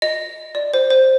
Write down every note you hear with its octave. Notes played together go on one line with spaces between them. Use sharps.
D#5
D5
C5
C5